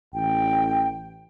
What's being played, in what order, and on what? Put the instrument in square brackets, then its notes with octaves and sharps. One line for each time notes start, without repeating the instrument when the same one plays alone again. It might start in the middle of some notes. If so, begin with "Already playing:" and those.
[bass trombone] A1 [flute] G5